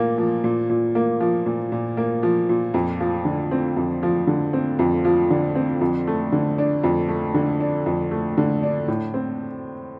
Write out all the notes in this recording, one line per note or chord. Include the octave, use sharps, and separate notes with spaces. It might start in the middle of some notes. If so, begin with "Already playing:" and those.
Already playing: A#2 A#3
F3
A#2
A#2
A#3
F3
A#2
A#2
A#3
F3
A#2
F2
F3
D3
C4
F2
F3
D3
C4
F2
F3
D3
C4
F2
A3
D3
D4
F2
A3
D3
D4
F2
A3
D3
D4
A2
C4